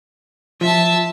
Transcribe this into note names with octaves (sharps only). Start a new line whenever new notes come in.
F3 E5 A5